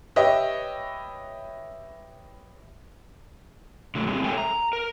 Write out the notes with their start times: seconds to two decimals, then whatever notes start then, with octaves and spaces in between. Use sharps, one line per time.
0.16 G4 B4 C#5 D#5 E5 G5
3.95 D3 F#3 A3
4.07 G3 G#3 C4 G4 G#4
4.24 A4 A#4 C#5 E5 G5 G#5
4.38 A#5
4.73 A#4